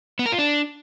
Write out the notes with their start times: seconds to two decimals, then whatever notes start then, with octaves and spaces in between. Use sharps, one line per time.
0.19 B3
0.26 A#4
0.32 F4
0.39 D4